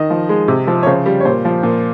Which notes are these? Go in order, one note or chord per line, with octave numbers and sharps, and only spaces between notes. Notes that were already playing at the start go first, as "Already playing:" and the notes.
Already playing: D#3 D#5
F3
G#3
C3
F3
C#5
C#3 C5
G3
C#5
A#2 C5
F3
A#2